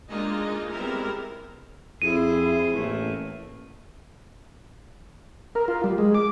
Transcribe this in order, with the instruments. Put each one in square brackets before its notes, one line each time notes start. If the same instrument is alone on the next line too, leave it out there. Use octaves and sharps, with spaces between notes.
[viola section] G#3 A#3 D4 D#4 F4 D#5
G3 G#3 B3 C4 E4 A#4
[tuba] F2 [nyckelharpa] C4 G#4 [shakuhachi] E4 [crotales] D#7
[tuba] A1 [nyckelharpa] A3 A#3
[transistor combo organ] A#4
F4
G3
G#3
D6